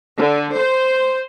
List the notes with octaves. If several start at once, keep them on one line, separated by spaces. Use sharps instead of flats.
D3
C5